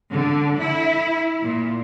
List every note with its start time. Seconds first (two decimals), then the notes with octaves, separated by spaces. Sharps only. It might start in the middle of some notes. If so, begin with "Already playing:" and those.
0.12 D3
0.59 E4
1.43 A#2